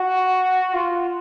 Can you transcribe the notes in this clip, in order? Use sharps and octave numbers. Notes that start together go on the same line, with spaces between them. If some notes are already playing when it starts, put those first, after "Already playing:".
Already playing: F#4
F4